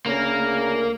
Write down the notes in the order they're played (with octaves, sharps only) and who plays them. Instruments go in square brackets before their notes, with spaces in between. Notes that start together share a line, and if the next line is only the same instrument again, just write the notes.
[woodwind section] D2 C#3 A#4 [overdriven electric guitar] A#3